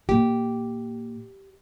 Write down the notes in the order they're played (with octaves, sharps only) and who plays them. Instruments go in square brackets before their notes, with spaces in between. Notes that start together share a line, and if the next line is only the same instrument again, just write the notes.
[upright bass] A#2 A#3 [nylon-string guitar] G4